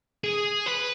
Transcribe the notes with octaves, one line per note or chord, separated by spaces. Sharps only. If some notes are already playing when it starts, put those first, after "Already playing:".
G#4
B4